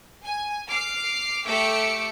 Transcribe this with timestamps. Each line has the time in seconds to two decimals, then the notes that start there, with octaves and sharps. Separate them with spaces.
0.25 G#5
0.69 D6 F6 C7
1.45 A3 G4 D6 E6 C#7